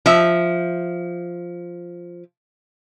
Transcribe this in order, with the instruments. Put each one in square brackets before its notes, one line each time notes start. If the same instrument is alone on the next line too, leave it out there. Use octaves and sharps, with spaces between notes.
[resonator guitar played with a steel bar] F3 E5